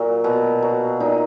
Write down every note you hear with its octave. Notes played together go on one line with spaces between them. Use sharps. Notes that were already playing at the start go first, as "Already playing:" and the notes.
Already playing: A#2 F#3
B2
F#3
A#2 D#4